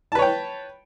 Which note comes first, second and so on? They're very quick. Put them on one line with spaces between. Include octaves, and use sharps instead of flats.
A5 B4 C#5 G5